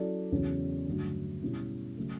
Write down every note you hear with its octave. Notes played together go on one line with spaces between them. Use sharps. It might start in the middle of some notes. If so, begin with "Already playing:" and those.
Already playing: F#3 C#4 E4 A4 D5
E2 C#3 F#3 C#4
G2 D3 F#3 A3
B2 G3 C#4 E4
C#3 F#3 A3